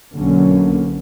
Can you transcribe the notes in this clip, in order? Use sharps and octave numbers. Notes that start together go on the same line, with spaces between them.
B1 D3 F#3 A#3 C#4